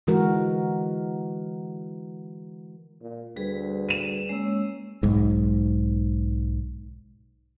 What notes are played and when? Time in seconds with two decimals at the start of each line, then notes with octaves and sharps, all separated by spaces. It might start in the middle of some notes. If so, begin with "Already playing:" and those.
0.07 D3 E3 G#3 F#4 A#4
3.01 A#2
3.36 D2 G3 G#4 B4
3.89 D#7 E7
4.29 G#3 A#3 C#4 E6
5.03 B1 G#2